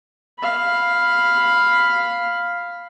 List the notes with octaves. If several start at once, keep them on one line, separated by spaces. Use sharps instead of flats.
F5 B5